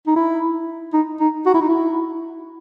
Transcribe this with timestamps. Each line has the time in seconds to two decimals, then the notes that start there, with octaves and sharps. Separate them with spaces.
0.07 D#4
0.16 E4
0.94 D#4
1.20 D#4
1.46 F#4
1.54 E4
1.62 D#4
1.69 E4